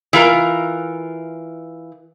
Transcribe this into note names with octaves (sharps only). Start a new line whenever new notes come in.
E3 F4 A#4